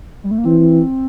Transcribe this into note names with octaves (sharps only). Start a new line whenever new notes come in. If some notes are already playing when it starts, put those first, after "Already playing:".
G3
A3
A#3
E3 C4